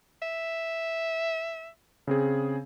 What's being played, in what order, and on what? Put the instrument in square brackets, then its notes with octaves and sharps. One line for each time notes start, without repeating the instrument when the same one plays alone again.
[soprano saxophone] E5
[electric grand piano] C#3 C4 G#4